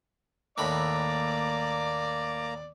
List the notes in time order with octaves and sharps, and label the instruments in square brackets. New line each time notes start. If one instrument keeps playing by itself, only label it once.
[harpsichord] D#2 A2 B5 [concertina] A#3 A#5 [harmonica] D5 D6